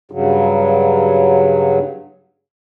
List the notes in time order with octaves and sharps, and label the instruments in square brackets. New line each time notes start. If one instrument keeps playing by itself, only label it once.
[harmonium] G2 C#3 F#3